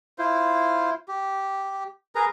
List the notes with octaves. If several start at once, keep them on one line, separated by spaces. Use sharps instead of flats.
E4 F4 C5
G4
G#4 A#4 B4 A#5